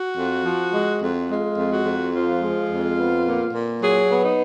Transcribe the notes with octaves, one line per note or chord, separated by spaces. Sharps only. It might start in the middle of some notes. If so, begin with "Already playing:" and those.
Already playing: F#4
F2
F3
G#3
F2
G#3 F4
F2
F#4
F2
F3 F4
G#3
F2
B3
A#2
A#2
F#3 G#4
B3
D#4